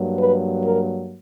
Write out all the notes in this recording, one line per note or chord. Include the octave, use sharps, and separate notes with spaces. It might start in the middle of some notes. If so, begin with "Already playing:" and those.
Already playing: G2 F#3 A#3
B4
A#4